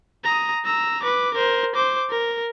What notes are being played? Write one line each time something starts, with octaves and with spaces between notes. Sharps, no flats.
A#5 D#6
A#5 E6
B4 D6
A#4 C5
C5 D6
A#4